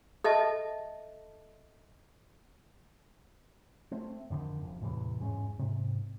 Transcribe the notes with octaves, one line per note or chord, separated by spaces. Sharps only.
A4 D#5 E5 A5
A3 C4
F2 D3 D#3
E1 F2
E2 A2 C3 E3
E2 G#2 G#3 C#4
G#2 C3